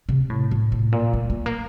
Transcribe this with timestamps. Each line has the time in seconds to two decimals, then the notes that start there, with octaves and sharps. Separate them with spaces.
0.09 C3
0.30 A2
0.51 A2
0.72 A2
0.92 A#2
1.13 A3
1.30 A3
1.46 A#3